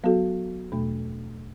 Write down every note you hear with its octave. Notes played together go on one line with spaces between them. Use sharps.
F#3 B3 F#4 A4
E2 B2 A3